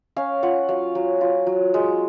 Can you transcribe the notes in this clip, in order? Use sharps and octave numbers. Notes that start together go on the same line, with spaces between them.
C#4 F5
F4 F#5
F#3 F5
F#3
F4
F#3
G#3